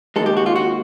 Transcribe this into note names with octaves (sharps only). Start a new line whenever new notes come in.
D#2 D#3 G#3 A4
G4
F#4
F4
F#4